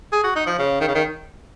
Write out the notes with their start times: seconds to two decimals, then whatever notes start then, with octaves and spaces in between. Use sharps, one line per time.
0.13 G#4
0.24 F#4
0.36 D#4
0.47 F3
0.59 C#3
0.81 D#3
0.88 C#3
0.95 D#3